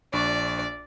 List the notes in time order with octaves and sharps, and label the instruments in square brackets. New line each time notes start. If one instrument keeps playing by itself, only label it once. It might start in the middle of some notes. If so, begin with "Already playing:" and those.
[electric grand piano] A#1 D4 C#6 [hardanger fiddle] D5